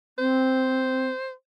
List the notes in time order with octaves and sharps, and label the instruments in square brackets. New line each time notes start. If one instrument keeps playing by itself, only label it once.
[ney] C4 [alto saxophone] C5